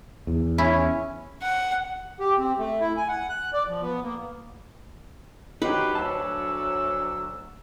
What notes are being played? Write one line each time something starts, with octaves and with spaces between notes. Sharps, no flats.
E2
C#4 E4
F#5
G4
C4
A3
E4
G#5
F#5
F#6
D5
F3
B3
A#3
C3 F#3 B3 D#4 G4 B4 C6
D2 F#3 C#4 D4 A5 E6